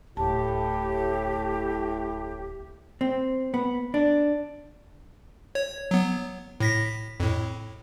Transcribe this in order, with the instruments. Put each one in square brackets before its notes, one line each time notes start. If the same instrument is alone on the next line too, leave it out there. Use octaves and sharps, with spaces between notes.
[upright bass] D1 [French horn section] A2 [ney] G4 [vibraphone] A5
[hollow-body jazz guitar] C4
B3
D4
[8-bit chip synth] C#5
F#3 B3
A2 A#6 B6
F2 A2